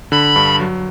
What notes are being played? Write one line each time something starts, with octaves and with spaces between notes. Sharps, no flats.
D3 B5
G2
F#3